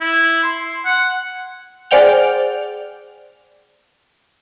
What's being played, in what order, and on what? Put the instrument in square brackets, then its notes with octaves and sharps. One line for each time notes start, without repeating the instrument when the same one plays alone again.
[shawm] E4
C6
F#5
[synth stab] G#4 C5 D5 F#5 G5 F6